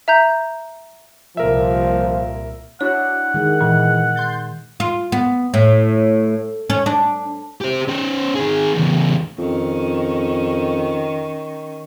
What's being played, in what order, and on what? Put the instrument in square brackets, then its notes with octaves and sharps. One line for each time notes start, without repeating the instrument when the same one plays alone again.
[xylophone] E5 A#5 G6
[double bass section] C2 A#2 [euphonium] F3 [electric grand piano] A#4 E5
[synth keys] D4 E4 F#4 [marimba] C#5 [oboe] F#5
[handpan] D#3 G#3
[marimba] A#2 [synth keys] E3
[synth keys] C6 G6 A6
[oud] F4
B3
A2
C#4
D4
[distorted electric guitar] G4 C5
C#4 C5
D#3 G#4
E2 C#3
[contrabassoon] F2 [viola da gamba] D#3 C#4